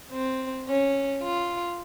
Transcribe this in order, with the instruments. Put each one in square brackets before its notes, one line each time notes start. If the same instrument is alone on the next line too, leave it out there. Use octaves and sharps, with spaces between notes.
[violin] C4
C#4
F4